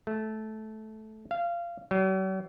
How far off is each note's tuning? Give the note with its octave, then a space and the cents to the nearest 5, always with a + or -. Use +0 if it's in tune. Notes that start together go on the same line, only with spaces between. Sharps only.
A3 -15
F5 -20
F#3 +45